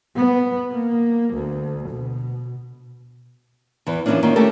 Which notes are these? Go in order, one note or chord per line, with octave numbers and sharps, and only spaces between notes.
B3
A#3
D2
B2
E2 E3
E3 F3 G#3 A#3 C#4 D4
D#3 A#3 C#4 F4
A3 C#4 G4 A4 A#4